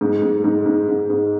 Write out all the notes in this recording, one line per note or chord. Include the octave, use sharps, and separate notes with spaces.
G#2
G#2
G#2
G#2
G#2
G#2